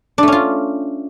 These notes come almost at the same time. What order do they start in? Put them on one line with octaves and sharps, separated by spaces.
D4 A3 C#4 F4